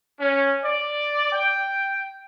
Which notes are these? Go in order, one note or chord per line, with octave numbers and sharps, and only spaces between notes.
C#4
D5
G5